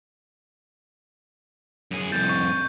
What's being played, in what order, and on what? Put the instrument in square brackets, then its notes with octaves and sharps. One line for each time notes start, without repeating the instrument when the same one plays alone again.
[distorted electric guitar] F#2 G#4
[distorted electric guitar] C2 F2 [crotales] G6 A6
[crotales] C#6